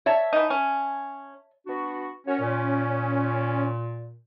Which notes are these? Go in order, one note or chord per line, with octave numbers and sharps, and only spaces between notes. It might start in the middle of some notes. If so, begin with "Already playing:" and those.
C#5 E5 A5
E3 D#4
C#4
B3 D4 F#4
C#4 F#4 A#4 C#5
A#2